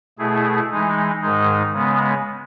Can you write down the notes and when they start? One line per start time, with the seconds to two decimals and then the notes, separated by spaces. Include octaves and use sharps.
0.19 B2 A3 E4 G#4
0.71 E3 G#3 D#4
1.21 G#2 D#3 G#3 D#4
1.73 C#3 G#3 B3